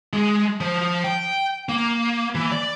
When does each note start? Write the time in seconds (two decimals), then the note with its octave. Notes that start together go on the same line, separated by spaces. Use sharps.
0.13 G#3
0.61 F3
1.04 G5
1.69 A#3
2.35 E3
2.52 D5